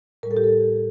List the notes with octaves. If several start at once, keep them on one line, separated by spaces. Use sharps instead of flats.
A2 G3 A4 A#4
G4
A4